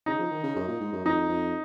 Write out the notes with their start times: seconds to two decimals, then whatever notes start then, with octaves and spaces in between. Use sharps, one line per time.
0.06 C#3 D#4
0.19 F3
0.31 D#3
0.43 C#3
0.56 F#2
0.68 A#2
0.80 G#2
0.93 F#2
1.05 F2 D#4
1.29 F2